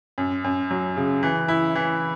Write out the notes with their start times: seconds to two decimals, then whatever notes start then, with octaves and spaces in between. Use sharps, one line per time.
0.18 F#2
0.44 F#2
0.71 F#3
0.97 C#3
1.23 E3
1.48 E4
1.75 E3